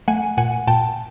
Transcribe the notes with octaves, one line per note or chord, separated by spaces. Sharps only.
A3 F#5 G#5
A#2 F#5 G#5
A#2 G5 A5